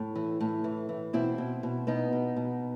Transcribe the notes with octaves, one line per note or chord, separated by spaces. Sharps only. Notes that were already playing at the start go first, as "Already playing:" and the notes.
Already playing: A2
E3
A2
E3
E3
B2 C4 E4
B2
B2
B2 B3 D#4
B2
B2